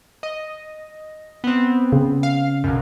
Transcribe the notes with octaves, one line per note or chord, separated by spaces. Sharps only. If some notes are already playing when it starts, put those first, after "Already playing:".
D#5
B3 C4
C#3
F5
B1 F#2